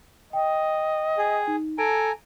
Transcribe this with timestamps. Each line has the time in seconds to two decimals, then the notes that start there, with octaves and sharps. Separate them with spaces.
0.33 D#5 G5
1.18 G#4
1.47 D#4
1.78 A4 G#5 A#5 D7